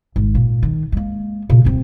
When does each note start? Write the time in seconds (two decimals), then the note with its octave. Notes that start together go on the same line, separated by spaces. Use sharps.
0.16 G#1
0.35 A#2
0.63 D#3
0.92 G#3 A#3
1.50 A#2 C#3
1.65 D1 C4